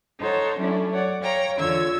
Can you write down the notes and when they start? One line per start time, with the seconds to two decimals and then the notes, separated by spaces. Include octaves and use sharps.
0.19 D#4 A4 C5 C#5 F#5
0.57 F#3 A3 C#4 D4 E4
0.91 C#5 D5 F#5
1.21 C#5 F5 G5 A#5
1.57 E2 D3 F4 C#5 E6 G#6